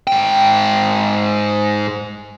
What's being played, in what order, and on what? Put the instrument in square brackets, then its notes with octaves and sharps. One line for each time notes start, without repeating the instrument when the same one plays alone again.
[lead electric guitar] G#2 G5